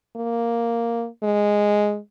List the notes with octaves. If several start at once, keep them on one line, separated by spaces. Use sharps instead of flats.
A#3
G#3